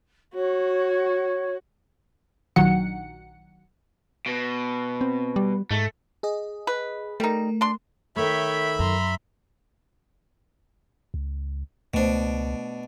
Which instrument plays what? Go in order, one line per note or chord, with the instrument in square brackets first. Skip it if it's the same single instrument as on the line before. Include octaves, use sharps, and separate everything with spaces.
[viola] F#4 [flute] C#5
[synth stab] A#1 D#3 F#3 F#5 C#7
[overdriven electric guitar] B2
[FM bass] C4
G3
[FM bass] G#2 [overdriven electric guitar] A3
[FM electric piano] G#4 D#5
[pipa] B4
[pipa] G3 D#4 [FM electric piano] A3 A#4
[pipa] D4 C6
[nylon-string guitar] D#3 A3 [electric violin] C#5 G5 [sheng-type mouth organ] E5 B5
[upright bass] F#2 [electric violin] A#5 C6
[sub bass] C#2
[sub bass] C#2 [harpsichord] B2 D4 [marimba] A3 C5